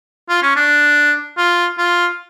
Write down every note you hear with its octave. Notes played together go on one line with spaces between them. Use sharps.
F4
C#4
D4
F4
F4